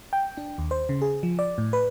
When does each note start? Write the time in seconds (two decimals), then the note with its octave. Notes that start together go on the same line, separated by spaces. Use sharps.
0.13 G5
0.37 D4
0.58 D#2
0.71 C5
0.89 C#3
1.02 G#4
1.23 F3
1.39 D5
1.58 A2
1.73 B4